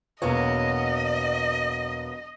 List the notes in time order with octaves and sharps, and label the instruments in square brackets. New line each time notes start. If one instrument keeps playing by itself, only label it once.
[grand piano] E1 C#5 [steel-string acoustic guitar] F#3 A#3 B3 [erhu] D#5